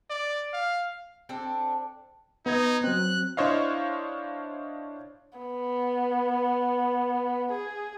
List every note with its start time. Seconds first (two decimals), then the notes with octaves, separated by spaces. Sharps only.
0.10 D5
0.53 F5
1.29 C4 D4 A4
2.46 B3 D#4 B4 G#6
2.84 F#3 C4 F#6
3.37 D4 E4 C5 C#5 D#5 F5
5.39 B3
7.51 G#4